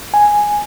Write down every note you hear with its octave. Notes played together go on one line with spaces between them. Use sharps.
G#5